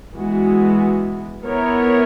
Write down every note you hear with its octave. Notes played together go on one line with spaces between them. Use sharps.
E3 G#3 B3 F#4
B3 E4 A#4 C#5